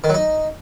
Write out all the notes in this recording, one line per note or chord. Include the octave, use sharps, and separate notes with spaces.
D#3
F#3
D#4